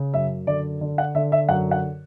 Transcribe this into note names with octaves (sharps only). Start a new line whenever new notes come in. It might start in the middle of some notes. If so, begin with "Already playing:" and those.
Already playing: C#3
F#2 E5
D3 D5
D3
F#5
D3 E5
E5
F#2 F#5
F#5